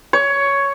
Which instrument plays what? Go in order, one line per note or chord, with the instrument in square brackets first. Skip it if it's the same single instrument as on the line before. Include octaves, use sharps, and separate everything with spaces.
[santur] C#5